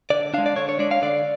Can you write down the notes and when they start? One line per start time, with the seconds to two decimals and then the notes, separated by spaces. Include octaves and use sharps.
0.10 D3 D5
0.34 G#3 D4 F5
0.46 D5
0.56 D3 C#5
0.69 C#5
0.79 G#3 D4 D5
0.91 F5
1.02 D3 D5